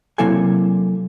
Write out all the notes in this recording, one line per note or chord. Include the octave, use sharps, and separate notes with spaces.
C3 F#3 A#3 E4 A4 G#5